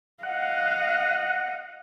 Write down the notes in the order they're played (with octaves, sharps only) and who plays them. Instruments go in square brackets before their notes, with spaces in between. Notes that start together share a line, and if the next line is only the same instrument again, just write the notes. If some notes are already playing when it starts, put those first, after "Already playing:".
[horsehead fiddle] D#5 F5 [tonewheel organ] F#5